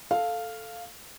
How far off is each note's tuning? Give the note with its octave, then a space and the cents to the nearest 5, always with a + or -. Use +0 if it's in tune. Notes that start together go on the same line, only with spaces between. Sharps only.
A4 +0 F5 +0